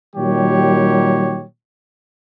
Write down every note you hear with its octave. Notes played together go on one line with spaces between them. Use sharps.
A#2 D#3 F#3 G3 G4 C#5